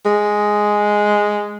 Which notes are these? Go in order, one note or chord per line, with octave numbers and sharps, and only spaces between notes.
G#3